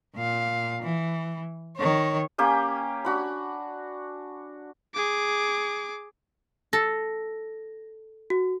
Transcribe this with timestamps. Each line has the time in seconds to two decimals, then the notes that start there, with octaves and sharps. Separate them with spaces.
0.16 A#2 F5
0.82 E3
1.78 D#3 C#5
2.38 A#3 C#4 G4 G#5
3.05 D4 F#4 B5
4.94 G#4 D6
6.73 A4 A#6
8.30 F#4